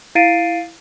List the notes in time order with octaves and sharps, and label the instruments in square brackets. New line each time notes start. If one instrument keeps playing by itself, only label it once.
[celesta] E4 F5 A6 C7 D7 D#7